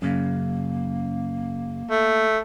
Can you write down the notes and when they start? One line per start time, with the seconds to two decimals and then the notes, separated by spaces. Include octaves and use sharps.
0.02 F#2 C#3 A#3
1.90 A3